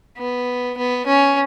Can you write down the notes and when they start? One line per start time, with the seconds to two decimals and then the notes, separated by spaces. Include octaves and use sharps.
0.18 B3
0.78 B3
1.07 C#4